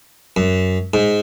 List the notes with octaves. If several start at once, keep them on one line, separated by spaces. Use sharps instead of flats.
F#2
G#2